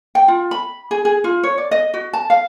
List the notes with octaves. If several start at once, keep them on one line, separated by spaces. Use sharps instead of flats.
G5
F4
B5
G#4
G#4
F4
C#5
D5
D#5
F#4
A5
F5